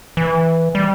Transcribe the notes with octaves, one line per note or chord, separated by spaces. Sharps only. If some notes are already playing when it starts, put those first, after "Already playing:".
E3
G3